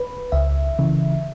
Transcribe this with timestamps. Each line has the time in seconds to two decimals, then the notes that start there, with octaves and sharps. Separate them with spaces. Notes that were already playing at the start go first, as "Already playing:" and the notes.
Already playing: B4
0.32 C#2 E5
0.79 C#3 E3